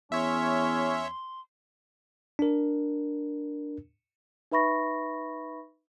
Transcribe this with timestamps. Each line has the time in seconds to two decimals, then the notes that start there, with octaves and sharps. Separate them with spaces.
0.12 E2 C#4 C#5 E5 C6
2.39 D4 A#4
4.51 D#4 B4 E5 B5 C#6 A#6